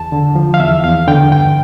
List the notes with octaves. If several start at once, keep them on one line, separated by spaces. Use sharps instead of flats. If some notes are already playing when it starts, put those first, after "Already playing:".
Already playing: E2 A5
D3
F3
F5
E2 E5
E2 F5
D3 G5
G2 G5